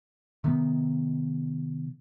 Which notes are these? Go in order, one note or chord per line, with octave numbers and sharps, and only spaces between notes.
C3 D#3 B3